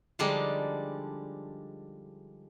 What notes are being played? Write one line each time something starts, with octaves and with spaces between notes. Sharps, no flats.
D3 F3 G3 G#3 D4 D#4